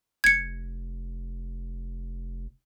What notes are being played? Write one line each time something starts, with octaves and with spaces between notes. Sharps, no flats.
F1 G#6 C#7